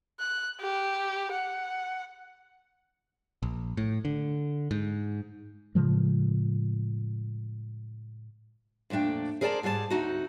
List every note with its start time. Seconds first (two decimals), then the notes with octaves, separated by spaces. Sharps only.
0.20 F#6
0.61 G4
1.32 F#5
3.43 A#1
3.77 A2
4.05 D3
4.71 G#2
5.75 A2 C#3 F3 G#3
8.90 F2 A#2 A3 D4 G5
9.41 G#4 A#4 C5 D5 G#5 A5
9.63 G#2 G3 G#4 B4 A5
9.90 D2 C4 D#4 F#4